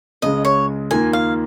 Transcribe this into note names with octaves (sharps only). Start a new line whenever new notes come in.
C#2 C#3 G#3 D#5
C#5
D#2 D#3 A#3 F4 A#4 G#5
F5